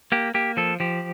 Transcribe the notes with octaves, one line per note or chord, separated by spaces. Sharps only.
A#3 G4
A#3 G4
F3 A4
F3 G4